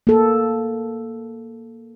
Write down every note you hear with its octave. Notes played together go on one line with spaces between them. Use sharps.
A#3 A4